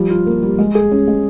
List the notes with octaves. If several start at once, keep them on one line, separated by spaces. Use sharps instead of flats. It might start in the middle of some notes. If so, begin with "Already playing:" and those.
Already playing: F3 G3
F4
A#3
G3
G#3
G#4
C#4
G#3